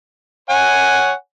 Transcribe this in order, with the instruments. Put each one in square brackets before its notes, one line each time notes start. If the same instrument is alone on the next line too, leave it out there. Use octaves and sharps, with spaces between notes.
[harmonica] C#5 F#5 G#5